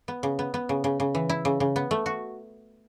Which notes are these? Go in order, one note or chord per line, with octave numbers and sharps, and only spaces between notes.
B3
C#3
B3
B3
C#3
C#3
C#3
E3
E4
C#3
C#3
B3
A3
F#4